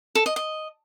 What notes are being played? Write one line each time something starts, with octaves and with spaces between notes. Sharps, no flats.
A4
D#5
D#5